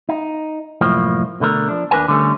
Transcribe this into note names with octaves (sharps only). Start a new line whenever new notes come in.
D#4
C2 F#2 A2 F3 A#3
B2 D3 A3 A#4
F3 D4
D#2 D4 A#4 B4 G#5
D3 G3 A3 C#4